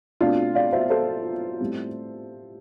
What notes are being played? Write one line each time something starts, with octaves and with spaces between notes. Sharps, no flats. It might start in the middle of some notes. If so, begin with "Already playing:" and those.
B2 A3 C4 D4 F4
D5 F5
C5 E5
A4 C5
A2 G3 C4